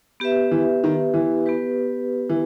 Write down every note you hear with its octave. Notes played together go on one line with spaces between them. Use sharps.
B3 G4 B4 E5
E3
D#3
E3
B3 G4 B4
E3